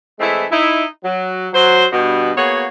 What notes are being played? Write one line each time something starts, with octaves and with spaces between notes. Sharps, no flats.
E3 G#3 A3 C4 E4
D#4 E4
F#3
F#3 C5
G2 B2
A#3 B3 F#4 G#4 C#5